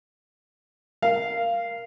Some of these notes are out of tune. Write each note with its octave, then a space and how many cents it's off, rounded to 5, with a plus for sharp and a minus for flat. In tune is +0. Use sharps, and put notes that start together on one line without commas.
A#4 +0 F5 -15